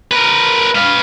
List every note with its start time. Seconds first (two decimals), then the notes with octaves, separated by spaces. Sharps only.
0.11 A#4 B4
0.75 B4 F5